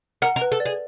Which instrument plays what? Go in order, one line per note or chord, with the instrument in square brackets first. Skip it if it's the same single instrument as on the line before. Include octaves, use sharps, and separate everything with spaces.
[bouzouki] A#4 [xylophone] F#5
[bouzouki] A#4
[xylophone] B4
[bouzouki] A4
[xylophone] D5
[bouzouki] G#4